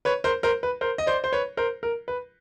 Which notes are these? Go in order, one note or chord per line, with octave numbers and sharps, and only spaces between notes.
B4 C#5
A#4 C5
A#4 C5
B4
A#4 C5
D#5
C5 D5
C5
B4 C#5
A#4 C5
A#4
B4